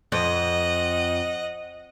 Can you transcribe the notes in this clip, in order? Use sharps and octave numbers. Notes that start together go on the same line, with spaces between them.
F2 D#5 F#5